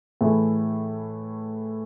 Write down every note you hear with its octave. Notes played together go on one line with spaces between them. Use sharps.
A2 E3 A3 E4 G#4